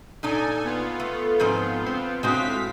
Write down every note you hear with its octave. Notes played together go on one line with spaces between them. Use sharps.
A#2 D#4 A4 D5 G#5
B3 F4
A3
G#2 F3 C4
C4
A2 G#3 C4 F#4 F5 B6